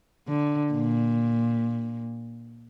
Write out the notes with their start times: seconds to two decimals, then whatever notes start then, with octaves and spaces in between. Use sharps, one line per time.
0.28 D3
0.73 A#2